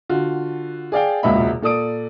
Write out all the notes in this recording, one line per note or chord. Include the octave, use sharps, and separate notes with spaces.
D3 F4 F#4
G#4 D5 F5 G5
E1 C#2 A#2 D#5 E5 B5
A#2 A4 D5 D#6 D7